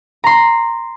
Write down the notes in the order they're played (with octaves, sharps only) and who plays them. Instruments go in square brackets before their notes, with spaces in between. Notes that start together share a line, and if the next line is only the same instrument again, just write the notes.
[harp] A#5 C6